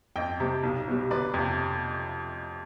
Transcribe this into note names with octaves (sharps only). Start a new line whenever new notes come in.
F2 D#5 G5
C3 G3
B1
B2 G3
G1 B4 D5
F2 C3